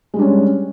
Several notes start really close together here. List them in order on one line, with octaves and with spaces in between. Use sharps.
G#3 G3 D4 C#4